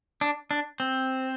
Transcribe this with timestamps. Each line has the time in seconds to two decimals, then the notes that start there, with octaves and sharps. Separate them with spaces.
0.21 D4
0.51 D4
0.80 C4